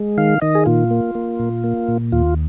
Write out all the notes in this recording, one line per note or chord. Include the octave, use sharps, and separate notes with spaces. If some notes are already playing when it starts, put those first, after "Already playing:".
Already playing: G#3
D#3 F5
D#3 D#5
G#4
A#2 F4
A#3
A#3
A#2
A#3
A#2
D#2 F4